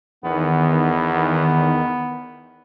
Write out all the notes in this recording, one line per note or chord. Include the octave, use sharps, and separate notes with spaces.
E2 D#3 B3